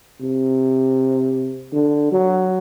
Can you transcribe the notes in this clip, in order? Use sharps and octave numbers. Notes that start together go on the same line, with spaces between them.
C3
D3
F#3